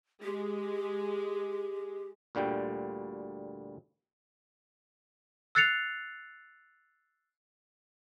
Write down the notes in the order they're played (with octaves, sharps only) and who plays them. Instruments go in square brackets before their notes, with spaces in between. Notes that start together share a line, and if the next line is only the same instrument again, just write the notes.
[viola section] G#3 [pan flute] G4
[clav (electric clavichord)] D2 A#2 D3 G3 G5
[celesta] E6 F#6 A6 C7 C#7 F7